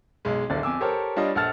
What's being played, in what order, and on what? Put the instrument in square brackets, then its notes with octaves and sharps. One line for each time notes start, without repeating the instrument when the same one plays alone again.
[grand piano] B1 G#3
D1 G#1 D3 D5
F2 G#5 D6 E6
G4 A4 A#4 C5 C#5
G3 D4 F4 C#5 D#5
A#1 A4 F#5 E6 F6 A6